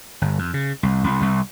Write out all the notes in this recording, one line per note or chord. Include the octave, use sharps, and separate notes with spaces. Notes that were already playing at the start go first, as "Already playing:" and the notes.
G1
F2
C#3
C2
C2
C2